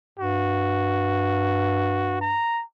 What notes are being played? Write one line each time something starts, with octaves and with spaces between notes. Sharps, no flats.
G2 F#4
A#5